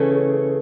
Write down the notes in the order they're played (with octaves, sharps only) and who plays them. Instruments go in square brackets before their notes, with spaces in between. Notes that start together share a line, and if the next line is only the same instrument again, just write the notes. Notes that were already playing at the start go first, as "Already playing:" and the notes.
Already playing: [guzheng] C#3 E3 A3